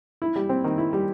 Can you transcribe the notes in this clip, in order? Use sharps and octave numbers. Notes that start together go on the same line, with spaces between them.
E4
G3
C4
D#3
E4
G3